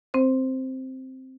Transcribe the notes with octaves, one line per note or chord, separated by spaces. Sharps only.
C4 C5